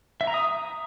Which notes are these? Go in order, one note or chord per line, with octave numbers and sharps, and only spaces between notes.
E5
A#5
D#6